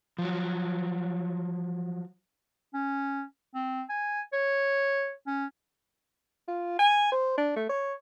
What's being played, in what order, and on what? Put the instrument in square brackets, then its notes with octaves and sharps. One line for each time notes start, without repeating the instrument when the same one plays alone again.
[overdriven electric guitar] F3 F#3
[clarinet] C#4
C4
G#5
C#5
C#4
[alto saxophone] F4
G#5
C5
D4
A3
C#5